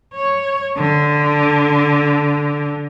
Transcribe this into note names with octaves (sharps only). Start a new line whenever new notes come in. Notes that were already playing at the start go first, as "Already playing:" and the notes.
C#5
D3